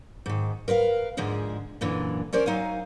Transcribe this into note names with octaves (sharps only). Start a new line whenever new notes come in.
G#2 D#3
A#4 B4 D5 F5
G#2 D3 F3 G#3 G#4
F#2 A#2 D3 E3
C#4 A#4 C5 D5
F#3 D#4 F5 G#5